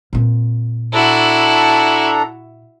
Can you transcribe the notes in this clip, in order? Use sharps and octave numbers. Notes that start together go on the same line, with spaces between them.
A#2 C4
D4 E4 F#4 A4 A#5